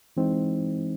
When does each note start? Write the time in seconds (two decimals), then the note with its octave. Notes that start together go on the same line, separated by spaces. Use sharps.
0.17 E3 G#3 C4 D#4